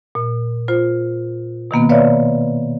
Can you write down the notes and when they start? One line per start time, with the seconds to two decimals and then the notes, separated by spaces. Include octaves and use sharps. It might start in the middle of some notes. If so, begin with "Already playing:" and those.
0.15 A#2
0.68 F4 C5
1.71 B2 D#3 A#3 B3
1.89 B4 C#5 D5 E5 F5